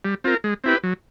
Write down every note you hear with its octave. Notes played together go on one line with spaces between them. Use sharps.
G3
C4 F4 A#4
G#3
C4 E4 G4 B4
F#3